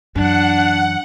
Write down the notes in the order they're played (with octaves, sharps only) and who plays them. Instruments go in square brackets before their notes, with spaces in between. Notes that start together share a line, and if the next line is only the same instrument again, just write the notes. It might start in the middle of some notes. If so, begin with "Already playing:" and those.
[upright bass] F#2 E3 [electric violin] D4 [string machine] F#5